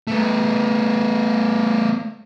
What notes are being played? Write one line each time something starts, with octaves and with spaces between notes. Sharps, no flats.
A3 B3